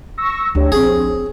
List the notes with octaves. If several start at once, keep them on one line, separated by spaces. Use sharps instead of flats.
C#6 E6 A#6
D2 D4 G4 C#5
A#1 C4 D4 G#4